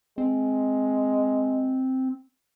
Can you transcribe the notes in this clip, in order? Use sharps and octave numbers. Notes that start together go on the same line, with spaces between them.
G#3 C4